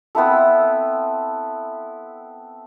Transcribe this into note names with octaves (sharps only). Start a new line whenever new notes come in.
B3 C4 E4 A4